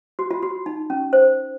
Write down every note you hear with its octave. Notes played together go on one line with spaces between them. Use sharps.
F#4
F4
F#4
D#4
C#4
C5